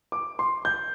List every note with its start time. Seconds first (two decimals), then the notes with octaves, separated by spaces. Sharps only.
0.12 D6
0.39 C6
0.65 G6